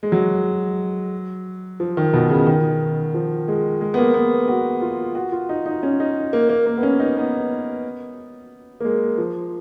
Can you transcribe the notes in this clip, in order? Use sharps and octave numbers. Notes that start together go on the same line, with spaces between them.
G#3
F#3
F3
D#3
B2
C#3
D#3
F3
G#3
G#3
B3
A#3
B3
F#4
F4
F#4
F4
D#4
D#4
C#4
D#4
A#3
A#3
A#3
B3
C#4
D#4
B3
A#3
G#3
F3